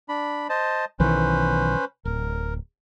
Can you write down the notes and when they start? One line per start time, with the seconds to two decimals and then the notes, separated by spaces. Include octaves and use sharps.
0.09 D4 B5
0.49 C5 D#5 A5
1.00 B1 D#3 E3 C#4 B4 C5
2.05 D1 A#4